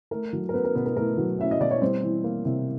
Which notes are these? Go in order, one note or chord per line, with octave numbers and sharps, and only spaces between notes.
A3 A#4
F#3
A#4
B3 C#4 B4
A#4
B2 B3 B4
A#4
A3 A#4
F#3
C#4 E5
D#5
B2 D5
C#5
G3 C4 C5
E3
A#3
C3